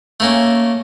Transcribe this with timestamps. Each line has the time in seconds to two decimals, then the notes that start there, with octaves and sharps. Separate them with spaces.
0.20 A3 A#3 C#4